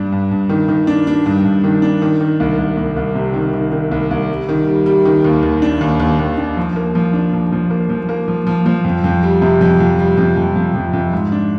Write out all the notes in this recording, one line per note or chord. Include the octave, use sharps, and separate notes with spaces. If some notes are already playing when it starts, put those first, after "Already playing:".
Already playing: G2 D4
G2
G2
D#3
D#3
D4
D4
G2
G2
D#3
D4
D#3
D#3
C2
C2
C2
C2
C3
D#3
D#3
D#3
C2
C2
G3
D#3
G3
G3
D#3
D#2
D#2
D4
D#2
D#2
D#2
D4
F3
A#3
F3
D4
F3
F3
A#3
F3
A#3
F3
F3
F3
F2
F2
G3
C3
F2
F2
G3
F2
F2
F2
F2
F2
G#2
D4